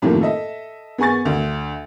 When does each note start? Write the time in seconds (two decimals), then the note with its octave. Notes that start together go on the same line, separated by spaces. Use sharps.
0.02 F#2 A2 C3 D#3 F3 A#3
0.21 A4 D#5 E5
0.98 B3 G#4 G#5 C#6 A6
1.25 D2